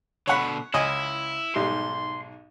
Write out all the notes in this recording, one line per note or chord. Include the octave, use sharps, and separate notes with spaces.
B2 D3 C#5 F#5 B5
C#2 E4 D#5 G#5
B1 G#2 G3 C6